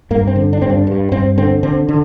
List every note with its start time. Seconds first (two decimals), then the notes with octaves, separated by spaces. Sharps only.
0.11 G2 A#3
0.27 C4
0.36 D3
0.53 D4
0.61 G2 C4
0.70 D4
0.87 G2
1.12 G2 C4
1.38 D3 C4
1.63 D3 C4
1.89 D3